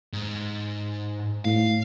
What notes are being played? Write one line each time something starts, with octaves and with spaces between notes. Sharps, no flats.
G#2
A2 F5